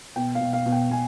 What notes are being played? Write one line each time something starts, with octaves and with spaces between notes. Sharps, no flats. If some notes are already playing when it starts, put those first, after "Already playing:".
B2 G5
F5
B2
F5
B2
G5
B2 G#5